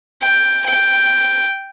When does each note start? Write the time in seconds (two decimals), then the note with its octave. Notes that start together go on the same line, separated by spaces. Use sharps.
0.22 G5
0.66 G5